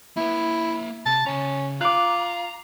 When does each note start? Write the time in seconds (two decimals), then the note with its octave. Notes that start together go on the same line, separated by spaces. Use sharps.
0.17 A#3 E4 B4
1.06 C3 A5
1.26 C#3 C#4 A#5
1.81 F4 A#5 D6 F#6